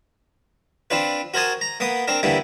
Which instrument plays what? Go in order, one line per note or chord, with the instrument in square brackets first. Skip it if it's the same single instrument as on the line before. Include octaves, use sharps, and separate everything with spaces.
[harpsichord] C4 D4 F4 B4
F#4 A#4 C5 G#5 A5 D#6
A#5
A#3 B3 F#5 D#6
C4 D4 A#4
G2 D3 E3 G3 A#3 B3